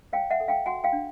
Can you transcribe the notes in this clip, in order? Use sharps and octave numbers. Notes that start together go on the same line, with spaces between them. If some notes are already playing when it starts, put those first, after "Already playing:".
C#5 F5 G5
E5 F#5
A4
F5 G5
F#4 F#5 G#5
F5 G5
D4